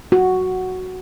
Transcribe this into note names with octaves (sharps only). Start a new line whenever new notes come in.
F#4